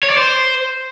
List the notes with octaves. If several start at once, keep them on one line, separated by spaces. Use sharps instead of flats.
C#5
D5
C5